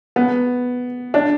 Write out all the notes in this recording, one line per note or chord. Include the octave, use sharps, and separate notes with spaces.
B3
D4